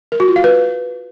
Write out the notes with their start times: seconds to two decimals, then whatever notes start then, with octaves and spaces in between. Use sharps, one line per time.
0.12 A#4
0.20 F#4
0.28 F4
0.36 F5
0.44 B4